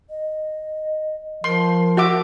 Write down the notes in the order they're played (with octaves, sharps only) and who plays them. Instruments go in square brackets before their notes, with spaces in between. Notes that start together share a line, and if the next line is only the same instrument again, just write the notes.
[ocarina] D#5
[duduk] F3 [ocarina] A#4 [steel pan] C6
[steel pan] F#4 E5 D6